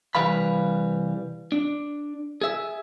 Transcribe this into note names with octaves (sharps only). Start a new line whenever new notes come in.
C2 E3 G3 B4 F5 B5
D4
G#4 E5